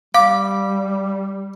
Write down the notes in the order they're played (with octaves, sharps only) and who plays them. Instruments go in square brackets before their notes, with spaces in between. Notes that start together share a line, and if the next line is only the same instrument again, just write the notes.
[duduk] G3 [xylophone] F5 [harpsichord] D6